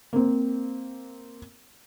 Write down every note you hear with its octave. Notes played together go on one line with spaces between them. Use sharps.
A#3 C4